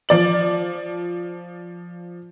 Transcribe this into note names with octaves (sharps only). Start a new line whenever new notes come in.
F3 D5 F#7